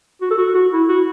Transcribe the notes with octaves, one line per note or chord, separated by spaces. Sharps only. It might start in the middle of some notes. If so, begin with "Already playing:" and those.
F#4
A4
F#4
F#4
E4
F#4